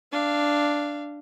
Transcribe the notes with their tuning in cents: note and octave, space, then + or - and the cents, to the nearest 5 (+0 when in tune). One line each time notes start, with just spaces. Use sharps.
D4 +0 F5 -20